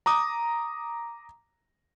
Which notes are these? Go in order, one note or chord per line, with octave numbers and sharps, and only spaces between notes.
A#5 D6 D#6